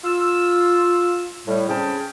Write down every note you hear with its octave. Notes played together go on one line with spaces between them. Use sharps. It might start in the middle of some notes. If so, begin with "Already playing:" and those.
F4 E6
A2 G3
C#3 C4 C#4 G#4 G5 A5